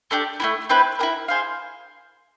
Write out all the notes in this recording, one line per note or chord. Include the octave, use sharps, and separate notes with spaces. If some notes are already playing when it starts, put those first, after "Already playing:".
A3 D4 G4
A3 C4 E4
C4 E4 G4 B4
E4 G4 A#4
G#4 C5 F5